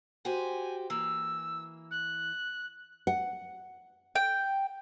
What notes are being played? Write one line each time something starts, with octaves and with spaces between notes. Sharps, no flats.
F#4 G4 C5 G#5
E3 A#3 E6
F#6
F#5
G5